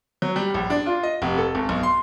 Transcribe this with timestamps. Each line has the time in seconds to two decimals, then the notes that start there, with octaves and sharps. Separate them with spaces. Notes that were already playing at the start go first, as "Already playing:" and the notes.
0.22 F#3
0.36 G3
0.54 A#1
0.70 D4
0.86 F4
1.03 D#5
1.22 F1
1.38 A4
1.55 G#1
1.69 B1
1.83 C6